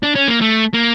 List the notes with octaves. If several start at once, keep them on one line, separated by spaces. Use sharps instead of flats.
D4
C#4
A#3
A3
A#3